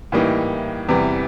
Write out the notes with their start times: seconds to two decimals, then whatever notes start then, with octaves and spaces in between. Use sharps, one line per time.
0.12 A2 E3 G3 A#3 D#4
0.89 E2 C3 E3 G3